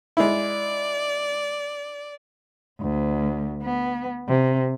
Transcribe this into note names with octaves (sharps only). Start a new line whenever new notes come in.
G#3 E4 D5
D2
B3
C3